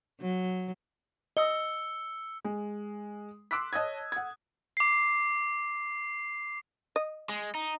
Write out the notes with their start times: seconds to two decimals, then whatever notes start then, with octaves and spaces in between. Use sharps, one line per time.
0.21 F#3
1.37 D#5 E6 C#7 G7
2.44 G#3
3.51 C6 D6 E6 F#6 B6
3.73 C#5 D#5 A5 D#6 G#6
4.12 F#5 G#6
4.77 D6 C7
6.96 D#5
7.29 G#3
7.55 D#4